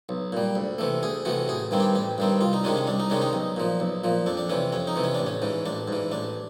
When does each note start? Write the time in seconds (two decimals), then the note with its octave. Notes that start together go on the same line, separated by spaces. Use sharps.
0.09 B1
0.32 A#2 G3
0.55 D2
0.78 C3 E3 A3
1.03 D2 G#4
1.25 C3 E3 A3 F#4
1.48 A1 G#4
1.71 G2 D#3 G3 C4
1.80 G4
1.95 A1 G4
2.18 G2 D#3 G3 C4
2.41 C2 F4
2.53 D#4
2.64 C3 D#3 G#3 C#4 D4
2.76 C#4
2.87 C2 D4
3.00 D#4
3.10 C3 D#3 G#3 C#4 D4
3.21 D#4
3.33 B1
3.56 A#2 F3
3.80 B1
4.04 A#2 F3
4.26 F2 D4
4.37 D4
4.49 C3 E3 C#4
4.72 F2 C#4
4.87 D#4
4.96 C3 E3
5.04 C#4
5.14 A1 D4
5.26 C#4
5.42 G#2 E3
5.66 A1 D4
5.88 G#2 E3
6.11 A1 D4